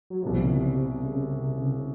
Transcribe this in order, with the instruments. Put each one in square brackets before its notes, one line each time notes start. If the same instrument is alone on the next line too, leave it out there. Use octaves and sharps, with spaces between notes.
[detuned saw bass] F#3
[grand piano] C2 B2 G3 [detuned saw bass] F3
[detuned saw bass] C#3
C3
C3
C#3
C3
C#3